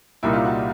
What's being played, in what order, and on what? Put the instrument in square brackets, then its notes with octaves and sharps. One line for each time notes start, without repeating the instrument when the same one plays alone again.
[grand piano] C2 A#2 G3 A#3 D#4 [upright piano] E4
[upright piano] F4
F#4